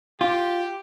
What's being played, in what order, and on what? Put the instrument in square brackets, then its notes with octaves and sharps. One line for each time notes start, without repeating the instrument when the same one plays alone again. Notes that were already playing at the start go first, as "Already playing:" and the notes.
[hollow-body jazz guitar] F4 [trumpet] G4